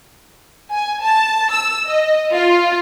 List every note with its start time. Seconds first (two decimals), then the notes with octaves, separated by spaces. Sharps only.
0.70 G#5
1.01 A5
1.50 E6
1.87 D#5
2.33 F4